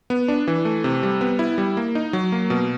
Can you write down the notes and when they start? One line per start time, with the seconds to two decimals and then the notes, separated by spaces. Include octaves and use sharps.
0.10 B3
0.28 D4
0.48 E3
0.65 A3
0.84 C3
1.03 G3
1.21 B3
1.39 E4
1.58 G3
1.77 A#3
1.95 D#4
2.13 F#3
2.32 A#3
2.50 B2